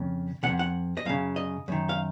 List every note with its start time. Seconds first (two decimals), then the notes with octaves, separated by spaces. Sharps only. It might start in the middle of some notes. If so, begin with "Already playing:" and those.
Already playing: F2 C#3
0.43 C#3 F#5
0.47 F2
0.59 F#5
0.97 D#5
1.05 F#2 C#3 F5
1.36 D#5
1.68 F#2 D#3
1.89 F5